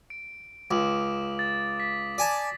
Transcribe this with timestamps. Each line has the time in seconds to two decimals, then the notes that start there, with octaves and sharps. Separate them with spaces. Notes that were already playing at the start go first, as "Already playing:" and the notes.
0.10 D7
0.71 C#2 D6 D#6 F#7
1.39 A6
1.80 B6
2.18 D5 G#5 A5